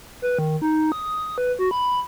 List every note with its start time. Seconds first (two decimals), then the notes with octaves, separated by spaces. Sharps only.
0.22 B4
0.39 D#3
0.62 D#4
0.92 D#6
1.38 B4
1.59 F#4
1.71 B5